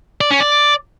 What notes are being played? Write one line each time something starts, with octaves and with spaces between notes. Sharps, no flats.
D5
C#4
D5